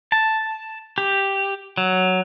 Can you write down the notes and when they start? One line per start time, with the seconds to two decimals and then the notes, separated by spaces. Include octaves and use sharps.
0.12 A5
0.98 G4
1.77 F#3